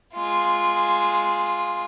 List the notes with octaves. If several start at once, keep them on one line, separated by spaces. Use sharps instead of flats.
G#3 F4